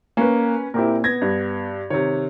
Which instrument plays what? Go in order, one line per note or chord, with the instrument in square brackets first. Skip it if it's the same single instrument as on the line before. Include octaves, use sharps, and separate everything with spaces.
[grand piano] A#3 [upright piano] C#4 B4
[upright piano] A#2 C4 [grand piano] E4 G4 A#4
[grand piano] B3 [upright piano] G#6 A#6
[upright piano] G2
[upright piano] C3 D#3 [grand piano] C#5